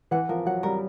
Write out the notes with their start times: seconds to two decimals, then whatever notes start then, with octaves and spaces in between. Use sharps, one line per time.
0.11 E3 F#5
0.29 F3 A#4
0.46 F#3 F#5
0.63 G3 A#4